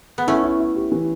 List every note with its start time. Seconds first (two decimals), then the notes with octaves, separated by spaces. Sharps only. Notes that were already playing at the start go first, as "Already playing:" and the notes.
0.18 B3
0.27 A3 C#4 E4
0.43 E4
0.60 E4
0.76 G4
0.92 E3